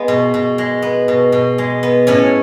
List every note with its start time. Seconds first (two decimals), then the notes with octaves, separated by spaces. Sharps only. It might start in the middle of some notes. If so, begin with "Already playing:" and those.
Already playing: G#3 B3
0.08 B2
0.34 B2
0.58 G#3
0.82 B3
1.08 B2
1.32 B2
1.58 G#3
1.83 B3
2.07 A2 C#4 C#5